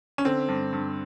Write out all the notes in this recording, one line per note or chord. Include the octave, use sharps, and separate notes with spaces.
C#4
D3 C4
G2
G2